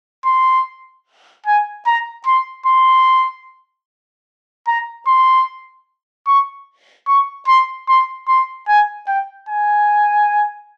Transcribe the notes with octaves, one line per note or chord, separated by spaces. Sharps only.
C6
G#5
A#5
C6
C6
A#5
C6
C#6
C#6
C6
C6
C6
G#5
G5
G#5